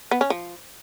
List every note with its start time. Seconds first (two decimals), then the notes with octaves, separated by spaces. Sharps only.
0.11 B3
0.21 C#4
0.30 F3